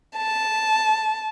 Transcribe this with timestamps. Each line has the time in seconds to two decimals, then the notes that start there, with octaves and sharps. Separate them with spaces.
0.16 A5